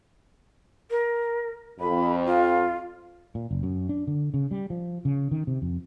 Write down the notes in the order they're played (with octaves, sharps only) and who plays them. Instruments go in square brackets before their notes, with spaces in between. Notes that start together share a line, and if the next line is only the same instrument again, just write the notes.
[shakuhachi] A#4
[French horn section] F2 [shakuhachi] B5
[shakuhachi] F4
[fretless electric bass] A#2
F#1
F#2
D4
D3
C#3
G3
F3
C#3
D#3
C3
F2